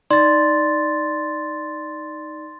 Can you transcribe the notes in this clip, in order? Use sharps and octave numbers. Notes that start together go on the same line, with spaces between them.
D#4 D5 C6 A6